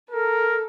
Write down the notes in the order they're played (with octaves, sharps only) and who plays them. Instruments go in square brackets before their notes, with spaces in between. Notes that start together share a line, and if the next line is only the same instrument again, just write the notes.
[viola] A4 [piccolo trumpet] A#4